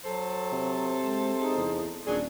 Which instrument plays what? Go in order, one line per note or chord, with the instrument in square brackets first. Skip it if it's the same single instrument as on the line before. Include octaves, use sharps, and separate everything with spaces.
[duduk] F#3 [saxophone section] A4 C5
[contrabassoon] C3
[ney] G#3
[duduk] D#4 [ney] G#4
[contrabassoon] E2
[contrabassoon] D#1 [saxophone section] A#2 F#3 G#4 [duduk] D4 [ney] D5